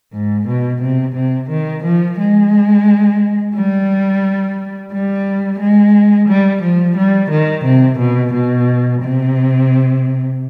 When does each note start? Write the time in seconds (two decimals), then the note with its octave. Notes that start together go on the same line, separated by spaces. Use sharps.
0.13 G#2
0.47 B2
0.81 C3
1.15 C3
1.49 D#3
1.83 F3
2.18 G#3
3.55 G3
4.92 G3
5.60 G#3
6.28 G3
6.63 F3
6.96 G3
7.30 D#3
7.65 C3
7.99 B2
8.33 B2
9.02 C3